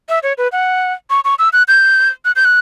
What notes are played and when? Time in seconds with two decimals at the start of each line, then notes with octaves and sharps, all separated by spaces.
0.09 E5
0.23 C#5
0.38 B4
0.52 F#5
1.10 C#6
1.25 C#6
1.39 E6
1.53 F#6
1.68 G6
2.25 F#6
2.36 G6
2.45 F#6